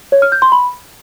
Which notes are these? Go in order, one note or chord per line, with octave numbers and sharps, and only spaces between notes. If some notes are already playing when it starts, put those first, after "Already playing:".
C#5
F6
G6
C6
B5